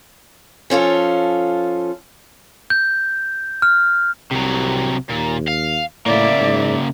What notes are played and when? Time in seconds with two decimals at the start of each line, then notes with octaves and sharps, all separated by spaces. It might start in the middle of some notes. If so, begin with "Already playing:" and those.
0.70 F3 C#4 F4 A4
2.70 G6
3.62 F6
4.32 C2 C3 F#3
5.10 D#2 A#2
5.48 F5
6.06 A2 C#3 A#3 D5 E5
6.40 G#2